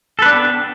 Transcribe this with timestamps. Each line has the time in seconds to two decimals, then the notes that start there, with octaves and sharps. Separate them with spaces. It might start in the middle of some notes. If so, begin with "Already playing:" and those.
0.19 A4
0.22 B4
0.26 D4
0.29 G4
0.33 B3